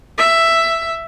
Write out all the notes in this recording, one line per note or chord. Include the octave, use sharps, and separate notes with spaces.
E5